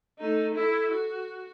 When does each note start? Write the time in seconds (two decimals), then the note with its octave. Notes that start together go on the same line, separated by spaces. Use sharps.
0.18 A3 D#4
0.54 E4 A4
0.91 F#4